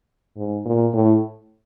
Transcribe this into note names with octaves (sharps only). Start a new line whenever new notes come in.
G#2
A#2
A2